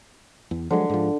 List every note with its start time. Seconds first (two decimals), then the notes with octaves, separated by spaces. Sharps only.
0.51 E2
0.71 D3 F3 F#3 G#3
0.90 G#2 F3